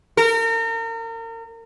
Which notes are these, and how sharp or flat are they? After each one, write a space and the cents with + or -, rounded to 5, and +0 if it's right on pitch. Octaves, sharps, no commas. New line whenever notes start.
A#4 -35